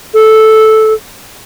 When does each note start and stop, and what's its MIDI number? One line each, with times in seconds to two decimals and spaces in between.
0.14 0.93 69